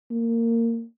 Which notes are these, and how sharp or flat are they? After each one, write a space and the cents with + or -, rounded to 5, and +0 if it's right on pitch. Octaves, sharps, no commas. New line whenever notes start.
A#3 -20